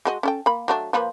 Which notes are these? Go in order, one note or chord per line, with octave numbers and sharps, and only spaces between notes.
G#3 F#4 D#5
C#4 A4 G5
A#3 B5
F#3 A3 D4
F3 A#3 B4